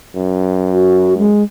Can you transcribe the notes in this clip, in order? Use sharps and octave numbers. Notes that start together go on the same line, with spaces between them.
F#2
F#4
G#3